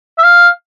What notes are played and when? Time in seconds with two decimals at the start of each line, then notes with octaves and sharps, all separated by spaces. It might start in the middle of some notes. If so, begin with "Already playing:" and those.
0.18 E5
0.24 F5